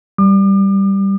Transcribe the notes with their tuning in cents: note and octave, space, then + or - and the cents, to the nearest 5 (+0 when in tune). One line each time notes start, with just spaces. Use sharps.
G3 +0 D6 +40